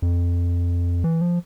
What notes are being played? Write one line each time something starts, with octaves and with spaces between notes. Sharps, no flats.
F2
E3
F3